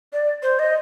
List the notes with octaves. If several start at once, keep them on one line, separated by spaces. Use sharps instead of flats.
D5
C5
D#5